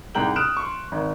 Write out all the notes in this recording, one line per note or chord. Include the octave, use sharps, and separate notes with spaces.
C2 G#2 G5 A#5 G6 F#7
D#6 F6 F#6 D7 E7
C6 C#6
G#1